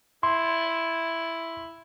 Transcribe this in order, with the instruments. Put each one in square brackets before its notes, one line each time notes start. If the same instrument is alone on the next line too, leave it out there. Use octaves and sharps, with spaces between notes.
[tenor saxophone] E4 [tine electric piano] C6